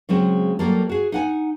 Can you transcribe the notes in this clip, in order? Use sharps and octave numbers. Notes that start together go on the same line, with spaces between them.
C#3 F#3 G#3 C4
F#3 G3 A#3 A4 A#4
F#4 G#4
D#4 F#5 G#5